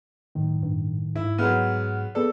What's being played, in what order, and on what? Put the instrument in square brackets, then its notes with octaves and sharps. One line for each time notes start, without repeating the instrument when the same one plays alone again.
[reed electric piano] F#2 A2 D#3
[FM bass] G2
[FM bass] G#2 [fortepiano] E4
[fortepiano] F#3 G#3 B3 [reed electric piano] F#5 F6
[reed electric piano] B3 G#4 D5 [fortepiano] A4